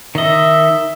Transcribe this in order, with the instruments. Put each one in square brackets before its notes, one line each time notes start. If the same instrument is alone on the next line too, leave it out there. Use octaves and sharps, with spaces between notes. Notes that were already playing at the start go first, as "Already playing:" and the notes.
[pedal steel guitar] D#3 D#5 [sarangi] E5